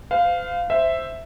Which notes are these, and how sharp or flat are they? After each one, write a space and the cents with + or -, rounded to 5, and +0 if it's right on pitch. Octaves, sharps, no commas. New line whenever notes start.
C5 -45 F5 +0
C5 +0 E5 +0